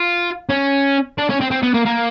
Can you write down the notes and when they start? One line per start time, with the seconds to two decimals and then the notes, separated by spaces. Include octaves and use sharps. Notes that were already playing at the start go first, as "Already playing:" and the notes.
Already playing: F4
0.49 C#4
1.18 D4
1.30 C#4
1.41 C4
1.51 C4
1.63 B3
1.74 A#3
1.86 A#3